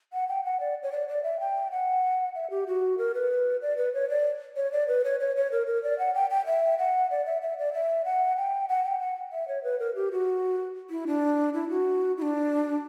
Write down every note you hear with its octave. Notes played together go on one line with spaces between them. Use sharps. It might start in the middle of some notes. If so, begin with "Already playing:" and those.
F#5
G5
F#5
D5
C#5
D5
D5
E5
G5
F#5
E5
G4
F#4
A#4
B4
D5
B4
C#5
D5
C#5
D5
B4
C#5
C#5
C#5
A#4
A#4
D5
F#5
G5
G5
E5
F#5
D5
E5
E5
D5
E5
F#5
G5
F#5
G5
F#5
E5
C#5
B4
A#4
G4
F#4
E4
D4
E4
F#4
E4
D4